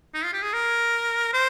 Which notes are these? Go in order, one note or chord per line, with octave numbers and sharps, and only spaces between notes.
D#4
F4
G4
G#4
A#4
C5